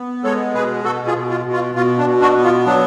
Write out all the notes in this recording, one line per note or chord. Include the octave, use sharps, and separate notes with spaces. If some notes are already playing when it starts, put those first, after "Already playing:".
Already playing: B3
G#3 A4 C#5
B2 G#4 B4
B2 F#4 A4
F4 G#4
B2
F4
B2
F4
B2 F4
D4
B2
D4 F#4
B3
F4
F#3 D4